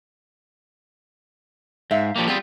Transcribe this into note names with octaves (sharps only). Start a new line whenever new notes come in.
G#2 E5 F5
F3 G3 A#3
G3 B3 C4 F4 G#4